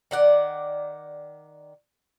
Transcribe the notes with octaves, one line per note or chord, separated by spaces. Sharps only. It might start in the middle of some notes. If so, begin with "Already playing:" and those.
D#3 D5 F#5